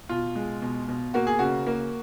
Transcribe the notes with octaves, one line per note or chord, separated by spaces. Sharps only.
B2 F4
G#3
B2
B2
A#3 F#4
G#4
C#3 F#4
A#3